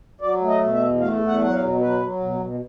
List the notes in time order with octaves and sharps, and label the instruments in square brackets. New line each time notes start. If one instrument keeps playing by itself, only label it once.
[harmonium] F#3 D5
A3
D#5
B2
E5
E2
A3 F5
E2
F#5
F#3 F#5
F5
B2
F#3 B4
F#3
B2
B2